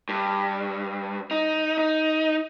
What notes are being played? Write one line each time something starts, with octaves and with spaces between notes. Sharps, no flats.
G2
D#4
D#4